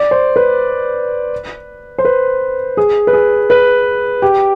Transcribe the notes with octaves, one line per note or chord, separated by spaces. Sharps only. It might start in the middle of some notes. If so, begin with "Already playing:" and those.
Already playing: D5
C5
B4
C5
B4
G#4
B4
G#4
B4
G4